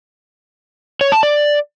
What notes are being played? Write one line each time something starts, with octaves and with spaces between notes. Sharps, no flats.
C#5
A5
D5